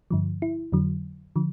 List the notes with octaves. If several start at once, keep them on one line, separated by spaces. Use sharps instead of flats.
G2 D3 F3
E4
F2 D3 F#3
D3 F3